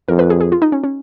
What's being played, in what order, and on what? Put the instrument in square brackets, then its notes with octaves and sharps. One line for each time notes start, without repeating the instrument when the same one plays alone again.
[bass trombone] F2 [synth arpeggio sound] A#4
[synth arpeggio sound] B4
G#4
G#4
F4
D#4
C#4
C#4